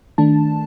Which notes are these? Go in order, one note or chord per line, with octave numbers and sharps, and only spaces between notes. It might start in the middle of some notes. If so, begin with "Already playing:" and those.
D#3 A3 D4 A5